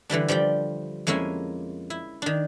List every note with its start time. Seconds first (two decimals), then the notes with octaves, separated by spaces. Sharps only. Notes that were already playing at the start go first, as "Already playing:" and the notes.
0.10 D3 E3 G3 D4
0.28 F3 G3 D5 G5
1.07 F2 G#3 A#3 C#4 E4 G#5
1.90 E4
2.22 D#3 D4